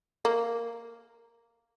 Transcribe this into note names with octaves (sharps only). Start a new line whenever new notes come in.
A#3